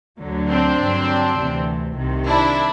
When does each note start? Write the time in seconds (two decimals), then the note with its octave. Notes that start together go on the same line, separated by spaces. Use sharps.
0.20 D2 D3 F#3
0.50 C4 D4
0.79 G2 D3 F#3
1.39 D2 C3 E3
1.97 C2 C3 D#3
2.27 D4 E4